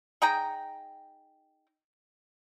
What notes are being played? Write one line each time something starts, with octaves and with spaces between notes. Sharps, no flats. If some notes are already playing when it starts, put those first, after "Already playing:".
D#4 G#4 G5 A#5